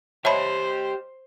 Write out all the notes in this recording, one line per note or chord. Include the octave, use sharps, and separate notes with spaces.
G4 C5 C#5 D#5 E5 A5 B5 C6